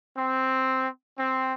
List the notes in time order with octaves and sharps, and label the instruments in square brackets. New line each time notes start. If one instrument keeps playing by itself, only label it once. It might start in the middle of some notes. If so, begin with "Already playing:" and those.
[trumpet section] C4
C4